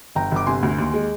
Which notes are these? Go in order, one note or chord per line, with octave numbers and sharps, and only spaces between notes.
G1 G5 A#5
G1 D6
C3 G#5 C6
D2
D#2
G#3